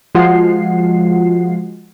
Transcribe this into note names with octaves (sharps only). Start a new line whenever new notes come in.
F3 G#3 F4 F#4 F#5 C7